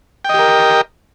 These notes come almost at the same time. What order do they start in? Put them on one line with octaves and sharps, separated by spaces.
G5 D#5 G4 A#4